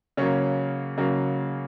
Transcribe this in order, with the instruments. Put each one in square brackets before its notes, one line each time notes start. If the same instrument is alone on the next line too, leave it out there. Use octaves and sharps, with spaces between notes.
[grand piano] C#3 F#3 A#3 C#4
C#3 F#3 A#3